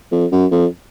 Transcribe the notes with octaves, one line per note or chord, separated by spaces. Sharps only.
F2
F#2
F2